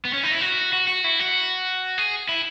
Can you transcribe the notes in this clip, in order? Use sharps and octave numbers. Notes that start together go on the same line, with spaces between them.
B3
C#4
D#4
E4
F#4
F#4
F#4
E4
F#4
G#4
E4